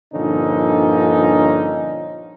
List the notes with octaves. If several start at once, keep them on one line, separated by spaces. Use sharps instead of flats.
G2 A#2 D3 F3 C#4 D#4